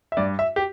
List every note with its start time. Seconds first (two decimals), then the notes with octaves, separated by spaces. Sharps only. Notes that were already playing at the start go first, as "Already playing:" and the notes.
0.12 E5
0.17 G2 D5
0.39 E5
0.56 G4